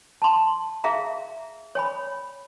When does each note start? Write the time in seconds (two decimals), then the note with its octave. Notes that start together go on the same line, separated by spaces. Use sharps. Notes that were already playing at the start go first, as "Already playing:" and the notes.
0.22 A5 C6
0.84 G#4 E5 F5 A#5
1.75 C#5 G#5 B5